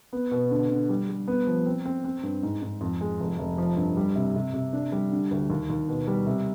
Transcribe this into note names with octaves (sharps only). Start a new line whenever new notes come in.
B3
B2
D3
D3
G3
G3
B3
F3
C4
C4
C4
G2
G#2
G#2
F2
G#3
F1
F1
F3
G2
G3
C3
C3
C3
D4
G3
D3
D2
D#2
D#2
B2
G3
C3